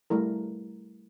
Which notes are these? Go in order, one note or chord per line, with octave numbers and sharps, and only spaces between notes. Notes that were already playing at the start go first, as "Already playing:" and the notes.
G3 A3 E4 A#4